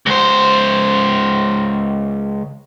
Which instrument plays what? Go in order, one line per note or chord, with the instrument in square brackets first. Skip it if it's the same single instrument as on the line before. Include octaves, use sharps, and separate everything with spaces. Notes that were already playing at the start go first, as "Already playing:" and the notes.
[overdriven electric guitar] C#2 C5